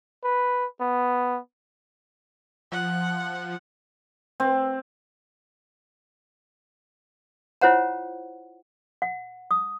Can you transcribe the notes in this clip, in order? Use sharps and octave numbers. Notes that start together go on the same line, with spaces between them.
B4
B3
F3 F#5
C4
E4 F4 C5 C#5 F#5 A#5
F#5
D#6